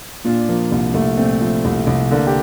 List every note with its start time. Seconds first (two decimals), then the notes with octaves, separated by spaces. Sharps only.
0.24 A#2 D4 F4
0.48 F3 A#3
0.71 C2 A#3
0.94 C2 A3
1.17 A#2 A3 C4
1.41 F3
1.65 C2
1.87 C2
2.11 D3 A#3
2.27 G4